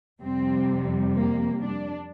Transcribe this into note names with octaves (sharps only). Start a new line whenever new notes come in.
F2 C3 G3 C4
A#3
D4